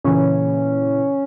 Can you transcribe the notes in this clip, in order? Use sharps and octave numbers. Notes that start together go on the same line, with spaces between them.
A#2 C#3 E3 C#4